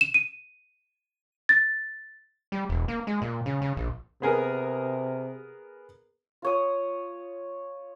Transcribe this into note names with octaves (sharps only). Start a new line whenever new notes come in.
E7
D#7
A6
G3
E1
A#3
G#3
A#2
C#3
C#3
A#1
C3 B3 G#4 A#4
F4 C#5 D#6